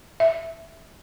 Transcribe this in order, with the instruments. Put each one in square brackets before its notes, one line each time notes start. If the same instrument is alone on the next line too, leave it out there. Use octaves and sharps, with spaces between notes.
[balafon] E5